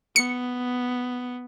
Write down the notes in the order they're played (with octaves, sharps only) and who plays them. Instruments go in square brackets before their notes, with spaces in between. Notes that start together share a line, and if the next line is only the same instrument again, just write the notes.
[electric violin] B3 [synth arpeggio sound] C#7